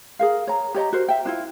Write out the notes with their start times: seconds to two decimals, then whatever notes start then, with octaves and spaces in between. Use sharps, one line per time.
0.19 G#4 A#4 F5
0.47 C#5 A#5
0.75 G4 C#5 D#5 A#5
0.93 F#4 A#4 C5
1.08 E5 G5
1.25 D4 E4 F4